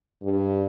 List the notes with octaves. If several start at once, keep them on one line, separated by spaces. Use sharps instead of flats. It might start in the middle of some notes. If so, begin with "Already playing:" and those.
G2